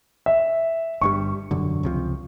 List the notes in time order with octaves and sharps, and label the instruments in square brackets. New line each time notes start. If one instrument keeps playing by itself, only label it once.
[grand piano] E5
[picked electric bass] G1 G2 G3 [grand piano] C#6
[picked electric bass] E1 F#2 D3
C#2 C3 F3